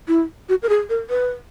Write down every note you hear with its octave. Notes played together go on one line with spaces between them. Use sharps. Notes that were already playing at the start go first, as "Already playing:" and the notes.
E4
F#4
A#4
G#4
A#4
B4